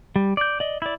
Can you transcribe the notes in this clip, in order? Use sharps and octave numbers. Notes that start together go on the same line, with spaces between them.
G3
D5 G6
D5 D#5
E4 D5